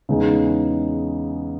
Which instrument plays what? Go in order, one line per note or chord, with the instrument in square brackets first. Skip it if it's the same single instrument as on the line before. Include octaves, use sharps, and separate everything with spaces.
[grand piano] E2 C#3 G#3 D#4 G#4